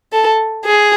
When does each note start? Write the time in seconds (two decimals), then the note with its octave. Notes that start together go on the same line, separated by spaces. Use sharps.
0.13 A4
0.65 G#4